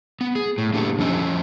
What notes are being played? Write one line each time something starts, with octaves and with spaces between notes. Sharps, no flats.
B3
G#4
A2
A#3 D4 G4 A4
F2 F3 C#4 A4 D#5